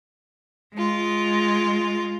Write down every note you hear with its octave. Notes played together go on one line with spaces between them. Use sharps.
G#3 F4